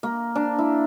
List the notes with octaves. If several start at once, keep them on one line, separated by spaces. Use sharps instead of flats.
A#3
D4
E4